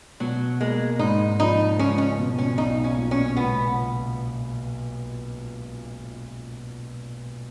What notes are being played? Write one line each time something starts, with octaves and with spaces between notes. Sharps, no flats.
B2 F#3
G#3 A#3
G#2 D#4
F3 D#4
C#2 C#4
C#4
B2
C#4
B1 D#4
C#4
A#2
C#4
C#2 B3